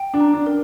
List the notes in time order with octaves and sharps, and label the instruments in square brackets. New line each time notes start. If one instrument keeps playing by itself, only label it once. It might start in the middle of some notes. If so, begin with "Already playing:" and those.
Already playing: [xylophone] G5
[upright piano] D4
[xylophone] A#5
[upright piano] D4
[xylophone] A#4